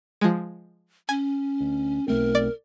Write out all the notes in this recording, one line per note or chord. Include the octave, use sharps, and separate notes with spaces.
F3 G#3
C#4 G#5
D2
B1 A3 C4 A#4
D5